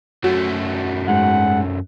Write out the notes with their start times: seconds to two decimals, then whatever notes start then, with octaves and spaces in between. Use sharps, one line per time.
0.24 F#2 A3 F#4
1.08 G#2 F#5